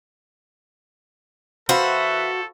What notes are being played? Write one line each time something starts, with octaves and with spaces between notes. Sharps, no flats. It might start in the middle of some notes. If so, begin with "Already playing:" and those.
E3 F#4 A4 B4 C5 E5 F5 B5